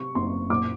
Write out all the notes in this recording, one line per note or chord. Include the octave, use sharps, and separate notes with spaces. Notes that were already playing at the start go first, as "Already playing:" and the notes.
Already playing: C3 C#6
F#1 C6
A#2 D6